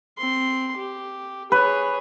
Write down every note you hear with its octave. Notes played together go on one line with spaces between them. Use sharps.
C4 C6
G4
G#4 B4 C#5